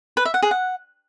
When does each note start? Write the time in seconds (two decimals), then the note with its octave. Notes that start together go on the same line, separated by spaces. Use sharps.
0.17 B4
0.25 E5
0.34 F#5
0.42 G#4
0.51 F#5